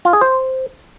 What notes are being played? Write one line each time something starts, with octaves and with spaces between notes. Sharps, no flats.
F4
G#4
C5